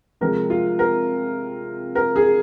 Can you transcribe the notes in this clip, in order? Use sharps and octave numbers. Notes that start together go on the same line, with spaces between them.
C3 F3 G#3 A#4
F4
A#4
A#4
G#4